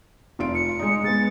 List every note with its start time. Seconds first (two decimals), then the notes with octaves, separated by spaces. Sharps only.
0.39 F1 F4 D7
0.55 C#7
0.79 G#3 D#4
1.04 G#3 B3 A6